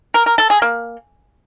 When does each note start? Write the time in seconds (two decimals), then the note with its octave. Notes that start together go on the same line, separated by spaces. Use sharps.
0.14 A#4
0.26 A#4
0.38 A4
0.50 G#4
0.62 A#3